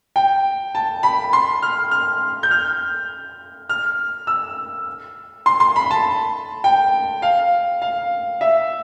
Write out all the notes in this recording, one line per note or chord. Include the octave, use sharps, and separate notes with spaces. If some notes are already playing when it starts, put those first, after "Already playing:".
G5
A5
B5
C6
F6
F6
G6
F6
F6
E6
C6
C6
B5
A5
G5
F5
F5
E5